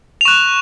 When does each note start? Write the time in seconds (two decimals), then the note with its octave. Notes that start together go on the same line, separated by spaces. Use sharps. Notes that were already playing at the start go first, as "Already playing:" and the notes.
0.21 F7
0.25 C#6 F#6 E7